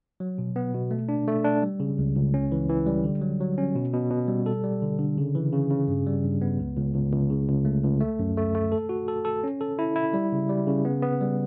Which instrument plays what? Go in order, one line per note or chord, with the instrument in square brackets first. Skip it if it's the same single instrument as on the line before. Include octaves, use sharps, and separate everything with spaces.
[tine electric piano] F#3
B2
B3
B2
A3
D4
A3
D4
G3
C#3
C#2
C#2
C#4
E3
E3
G3
D3
F#3
F#3
C#4
B2
B2
B2
G3
A4
G3
D3
D3
C#3
E3
C#3
C#3
G2
G3
G2
B3
C#2
C#2
C#2
C#2
C#3
C#2
A3
C#2
A3
F#2
A3
A3
A4
F#4
A4
A4
C#4
A4
E4
E4
G3
C#3
G3
C#3
B3
B3
G3